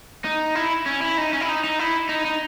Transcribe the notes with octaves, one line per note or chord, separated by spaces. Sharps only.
D#4
E4
C#4
E4
D#4
C#4
E4
D#4
D#4
E4
D#4
D#4